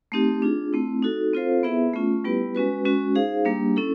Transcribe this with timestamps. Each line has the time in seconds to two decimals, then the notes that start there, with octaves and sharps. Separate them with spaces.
0.12 A3 C4 D#4 G4
0.42 D4 F4 G#4
0.73 A3 C4 E4
1.03 D#4 F#4 A4
1.34 C4 F4 A4 C5 F5
1.63 B3 E4 G#4 B4 E5
1.94 A3 C#4 F4
2.24 G3 B3 E4 G4 B4
2.55 G#3 C#4 F#4 B4
2.85 G#3 C#4 F#4
3.15 D#4 G#4 C5 F5
3.45 G3 A#3 D4 G4
3.76 C#4 E4 A4